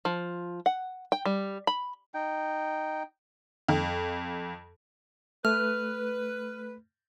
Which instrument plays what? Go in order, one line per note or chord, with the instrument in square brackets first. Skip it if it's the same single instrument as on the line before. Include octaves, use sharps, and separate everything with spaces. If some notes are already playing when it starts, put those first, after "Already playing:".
[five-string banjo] F3
F#5
G5
G3
B5
[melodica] D#4 G5
[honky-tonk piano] F2
[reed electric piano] A3 [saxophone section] B4 [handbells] F6